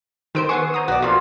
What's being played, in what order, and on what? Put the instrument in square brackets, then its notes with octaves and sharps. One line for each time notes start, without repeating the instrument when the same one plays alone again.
[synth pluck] D#3 D7 [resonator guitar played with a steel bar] C4 B4 C5
[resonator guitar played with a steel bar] B3 G#4 [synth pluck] C#6 C7
[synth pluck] C5 A#5 D#6
[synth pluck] B1 [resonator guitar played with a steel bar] F#4 D5
[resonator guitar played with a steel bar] F2 A#2 F3 [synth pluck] F#4